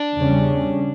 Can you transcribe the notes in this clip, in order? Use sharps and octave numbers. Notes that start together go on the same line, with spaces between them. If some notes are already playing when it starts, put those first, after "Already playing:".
Already playing: D4
E2 C#3 G3 C#4